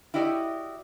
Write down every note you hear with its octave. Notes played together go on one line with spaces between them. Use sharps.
E4 F#4 G4 D5 D#5